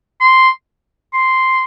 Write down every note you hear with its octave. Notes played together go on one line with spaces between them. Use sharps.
C6
C6